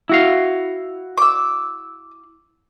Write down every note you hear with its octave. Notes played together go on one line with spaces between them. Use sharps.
E4 F#4 F5
D6 E6